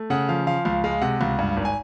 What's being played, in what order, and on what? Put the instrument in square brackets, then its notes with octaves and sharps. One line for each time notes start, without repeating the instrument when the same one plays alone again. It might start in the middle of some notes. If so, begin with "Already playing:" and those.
Already playing: [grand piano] A3
C#3 F#5
F3 F5
F3 F5
C#2 F5
G#3 F5
C3 F#5
C#2
G2
G#1
G#5